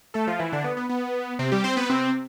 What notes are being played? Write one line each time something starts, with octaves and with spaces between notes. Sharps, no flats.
A3 A4
F3 F4
E3 E4
D3 D4
B3
B3
B3
C3 C4
G3 G4
C4 C5
B3 B4
C3 C4